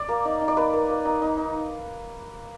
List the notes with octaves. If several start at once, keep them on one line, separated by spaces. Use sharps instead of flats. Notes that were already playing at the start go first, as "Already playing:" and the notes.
Already playing: D5
A#3
D#4
D#4
D5
A#3 B4
A#3
A#3
D#4
D#4
D#4